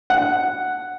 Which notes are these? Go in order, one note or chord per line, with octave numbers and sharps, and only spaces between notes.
F#5